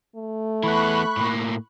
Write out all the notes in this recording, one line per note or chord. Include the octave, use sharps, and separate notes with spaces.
A3
E3 B3 B5 C#6 F#6
A2 A#3